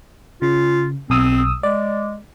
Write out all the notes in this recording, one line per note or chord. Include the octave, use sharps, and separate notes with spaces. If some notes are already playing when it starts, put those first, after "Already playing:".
C#3 F4
B1 C4 D#6 E6
G#3 D5